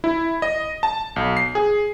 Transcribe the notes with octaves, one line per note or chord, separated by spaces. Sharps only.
E4
D#5
A5
B1
C7
G#4